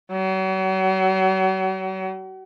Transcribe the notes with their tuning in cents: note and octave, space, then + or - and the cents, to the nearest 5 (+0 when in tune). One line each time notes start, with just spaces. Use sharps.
F#3 +40